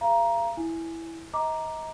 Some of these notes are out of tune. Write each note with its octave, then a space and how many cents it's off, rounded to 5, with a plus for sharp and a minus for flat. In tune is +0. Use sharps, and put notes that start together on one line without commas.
G#4 +0 F5 -35 A#5 +10
E4 +0 G#5 +0
D#5 +30 A#5 +0 D6 +10